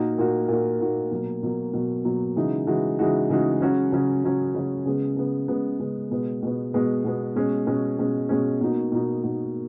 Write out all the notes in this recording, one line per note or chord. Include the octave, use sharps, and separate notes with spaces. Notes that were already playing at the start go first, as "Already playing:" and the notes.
Already playing: A#2 A#3 D#4 F#4
A#2 A#3 D#4 F#4
A#2 A#3 D#4 F#4
A#2 A#3 D#4 F#4
B2 F#3 A#3
B2 F#3 A#3
B2 F#3 A#3
B2 F#3 A#3
C#3 E3 G#3 D#4 F#4
C#3 E3 G#3 D#4 F#4
C#3 E3 G#3 D#4 F#4
C#3 E3 G#3 D#4 F#4
C#3 F#3 C#4 F#4
C#3 F#3 C#4 F#4
C#3 F#3 C#4 F#4
C#3 F#3 C#4 F#4
C#3 G#3 B3
C#3 G#3 B3
C#3 G#3 B3
C#3 G#3 B3
B2 G#3 B3
B2 G#3 B3
B2 G#3 B3
B2 G#3 B3
B2 G#3 C#4
B2 G#3 C#4
B2 G#3 C#4
B2 G#3 C#4
B2 A#3 D#4 F#4
B2 A#3 D#4 F#4
B2 A#3 D#4 F#4